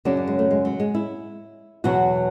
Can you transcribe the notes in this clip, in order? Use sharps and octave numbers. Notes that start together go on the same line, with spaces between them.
F#2 C#3 F#3 D4
D4
G#3
A3
G#3
F#3
G#3
E4
E2 B2 F#3 F#4